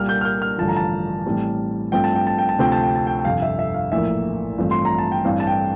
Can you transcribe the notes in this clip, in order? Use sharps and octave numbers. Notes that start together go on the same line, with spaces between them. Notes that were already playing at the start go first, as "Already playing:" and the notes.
Already playing: C2 A#2 G3 A#3 F6
G6
F6
G6
F6
A1 G2 D3 F3 A5
A#5
A5
A1 A2 G3 C4
G2 F3 A3 C4 G5
A5
G5
A5
G5
A5
D2 C3 F3 C4 G5
A5
G5
A5
G5
G5
G1 F2 C3 F5
E5
E5
F5
A#1 A2 E3 A#3 E5
A1 G2 F3 A3 C4
C6
A#5
A5
G5
A1 G2 E3 A3 C4 F5
A5
G5